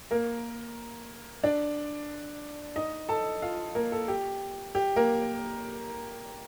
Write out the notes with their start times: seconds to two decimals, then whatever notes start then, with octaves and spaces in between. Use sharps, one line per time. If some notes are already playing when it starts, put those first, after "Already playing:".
0.11 A#3 A#4
1.44 D4 D5
2.76 D#4 D#5
3.09 A4 A5
3.42 F4 F5
3.75 A#3 A#4
3.92 A4
4.08 G4
4.75 G4
4.96 A#3 A#4